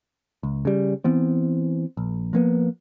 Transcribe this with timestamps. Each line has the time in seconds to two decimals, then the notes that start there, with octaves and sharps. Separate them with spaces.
0.43 C#2
0.65 C#3 G3
1.04 E3 B3 C4
1.97 A#1
2.33 F3 A#3 B3